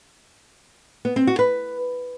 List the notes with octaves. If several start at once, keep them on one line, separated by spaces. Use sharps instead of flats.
B3
C4
F#4
B4